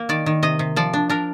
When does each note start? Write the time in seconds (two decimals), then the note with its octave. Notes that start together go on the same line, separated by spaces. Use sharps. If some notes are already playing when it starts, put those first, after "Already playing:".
Already playing: A#3
0.09 D#3 D5
0.26 D#3
0.43 C3 D#5
0.59 C3
0.76 F3 D5
0.93 D4
1.09 D4 A#4